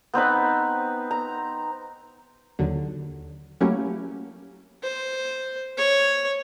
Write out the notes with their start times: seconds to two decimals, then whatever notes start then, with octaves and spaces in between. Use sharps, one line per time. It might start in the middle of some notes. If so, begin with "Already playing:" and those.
0.14 B3 C4 D#4 B4
1.11 A#5
2.59 D#2 D3 F#3
3.61 F#3 A3 A#3 C#4 E4 G4
4.83 C5
5.78 C#5